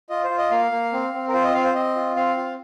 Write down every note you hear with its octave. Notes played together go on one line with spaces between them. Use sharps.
F4 D#5
C5
F4
D#5
A#3 F5
A#3
C4
C4
A#4
F4 C5
D#5
C4 F5
C5
C4 D#5
F4
C4 F5
F4